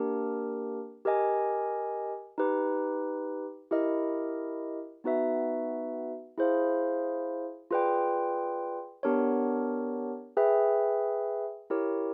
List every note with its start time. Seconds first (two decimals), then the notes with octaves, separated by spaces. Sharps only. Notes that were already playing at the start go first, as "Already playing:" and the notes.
Already playing: A#3 D4 G4 A#4
1.05 G4 A#4 D#5 G#5
2.38 D#4 G4 B4
3.71 E4 G4 A#4 D#5
5.04 B3 D#4 F#4 B4 E5
6.38 E4 G#4 C5 F5
7.71 F4 G#4 B4 D5 G5
9.03 B3 D4 G4 A#4 C#5
10.37 G#4 B4 E5 G5
11.70 E4 G4 A#4 C#5